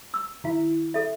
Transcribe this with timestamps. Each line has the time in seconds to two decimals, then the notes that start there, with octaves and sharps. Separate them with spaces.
0.14 E6
0.44 D#3 E4
0.94 A4 E5